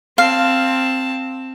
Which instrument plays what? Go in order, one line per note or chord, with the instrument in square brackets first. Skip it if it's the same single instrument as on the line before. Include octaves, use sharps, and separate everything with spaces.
[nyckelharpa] C4 A5 [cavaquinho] F5